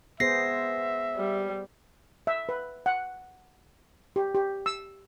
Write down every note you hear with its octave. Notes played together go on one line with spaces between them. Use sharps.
B3 G#4 C5 E5 A#6 C7
G3
E5
B4
F#5
G4
G4
E6